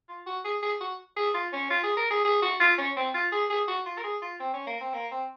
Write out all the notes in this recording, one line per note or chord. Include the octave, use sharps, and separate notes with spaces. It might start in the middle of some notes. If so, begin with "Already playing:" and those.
F4
F#4
G#4
G#4
F#4
G#4
F4
C#4
F4
G#4
A#4
G#4
G#4
F#4
F4
C#4
C4
F4
G#4
G#4
F#4
F4
A#4
G#4
F4
C4
C#4
A#3
C4
A#3
C4